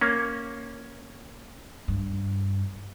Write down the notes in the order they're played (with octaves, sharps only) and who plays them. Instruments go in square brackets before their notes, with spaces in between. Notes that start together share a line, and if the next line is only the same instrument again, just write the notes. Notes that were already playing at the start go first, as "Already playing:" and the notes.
[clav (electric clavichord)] A#3 C#4
[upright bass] G2